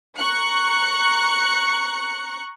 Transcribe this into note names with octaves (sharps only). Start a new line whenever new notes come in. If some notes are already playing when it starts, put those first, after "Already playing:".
A#5 C#6 F#6 C#7